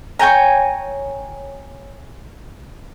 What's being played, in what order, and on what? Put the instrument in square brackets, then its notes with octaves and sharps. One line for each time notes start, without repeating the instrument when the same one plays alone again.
[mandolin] C#5 G5 G#5 A#5